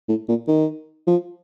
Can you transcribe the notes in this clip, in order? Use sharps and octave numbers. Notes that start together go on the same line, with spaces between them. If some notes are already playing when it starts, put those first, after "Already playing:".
A2
A#2
D#3
F3